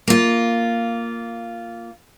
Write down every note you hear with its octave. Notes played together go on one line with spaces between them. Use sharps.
A#3 F4